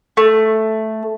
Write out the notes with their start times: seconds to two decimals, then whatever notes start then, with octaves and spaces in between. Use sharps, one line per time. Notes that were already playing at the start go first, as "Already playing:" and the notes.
0.17 A3